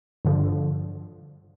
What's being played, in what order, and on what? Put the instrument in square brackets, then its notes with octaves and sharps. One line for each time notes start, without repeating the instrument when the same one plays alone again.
[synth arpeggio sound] G2 D3 F3